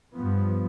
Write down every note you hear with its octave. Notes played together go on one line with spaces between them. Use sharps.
G2 F3 B3